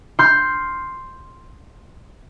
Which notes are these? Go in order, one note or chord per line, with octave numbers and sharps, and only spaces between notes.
C6 F6 G6